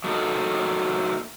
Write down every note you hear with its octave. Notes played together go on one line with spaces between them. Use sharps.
F#3 A3 A#3 D#4 A4